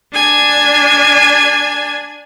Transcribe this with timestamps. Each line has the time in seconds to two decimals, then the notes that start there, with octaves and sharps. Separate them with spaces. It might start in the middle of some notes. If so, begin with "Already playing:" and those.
0.14 D4 G#5